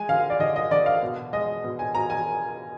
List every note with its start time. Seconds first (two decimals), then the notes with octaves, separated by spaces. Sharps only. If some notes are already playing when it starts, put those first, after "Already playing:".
Already playing: G#3 G#5
0.09 D3 F5
0.30 D5
0.39 D3 D#5
0.56 D#5
0.71 D3 D5
0.86 F5
1.02 B2
1.33 G#3 D#5
1.64 B2
1.79 G#5
1.95 B2 A#5
2.10 G#5